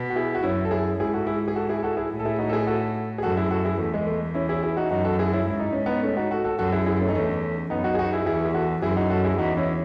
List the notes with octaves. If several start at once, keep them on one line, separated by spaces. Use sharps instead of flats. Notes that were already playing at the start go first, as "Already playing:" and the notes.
Already playing: B2
F#4
E4 G#4
F#4
F#2 C#4 E4
A4
E4 G#4
G#2 E4 G#4
F#4 A4
E4 G#4
G#4
F#4 A4
E4 G#4
F#4 A4
E4 G#4
A2
A4
E4 G#4
D#4 F#4
A4
E4 G#4
F#4 A4
G#4
F#2 F#4 A4
E4 G#4
F#4 A4
E4 G#4
E2 A3
G#3
A3
C#4 E4
E4 G#4
E4 G#4
D#4 F#4
F#2 D#4 F#4
F#4 A4
E4 G#4
C#4 E4
G#2 E4
D#4
C#4
B3 D#4
A3 C#4
D#4 F#4
F#4 A4
F#4 A4
F#2 F#4 A4
E4 G#4
E4 G#4
A3 C#4
D#4
E2 A3 C#4
F#2 B3 D#4
D#4 F#4
G#4
D#4 F#4
E4 G#4
E2 E4 G#4
G#4
F#4 A4
F#2 E4 G#4
D#4 F#4
F#4 A4
E4 G#4
E2 D#4 F#4
C#4 E4